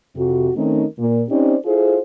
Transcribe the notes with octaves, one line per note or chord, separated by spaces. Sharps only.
F2 C3 F#4
D#3 A3 C4 C#4 D#4 A#4
A#2
C4 C#4 D#4 G4 C5 D5
E4 F4 G#4 A4 C5